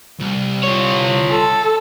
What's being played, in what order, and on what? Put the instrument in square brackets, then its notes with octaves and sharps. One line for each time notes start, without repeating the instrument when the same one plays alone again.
[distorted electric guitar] C2
[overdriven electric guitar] F4 C#5
[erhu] A4